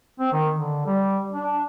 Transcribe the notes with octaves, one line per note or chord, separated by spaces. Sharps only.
C4
D#3
D3
G3
D4